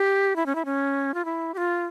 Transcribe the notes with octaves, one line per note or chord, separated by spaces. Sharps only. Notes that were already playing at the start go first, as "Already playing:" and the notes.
Already playing: G4
E4
C#4
E4
C#4
F4
E4
G4
F4